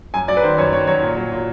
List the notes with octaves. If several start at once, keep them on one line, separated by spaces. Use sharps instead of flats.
F#2 G#5
F#3 D5
B4
D#3 C5
F#2 C#5
D#3 C#5
F#3 C#5
A#2
F#3
A#2